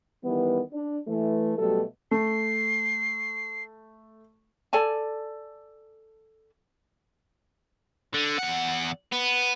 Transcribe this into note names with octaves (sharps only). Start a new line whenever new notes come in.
D#3 E3 G3 B3
D4
E3 A3
B2 F#3 G3 A3 A4
A3 C7
A4 D5 G#5 A5
D3
E2 F#5
B3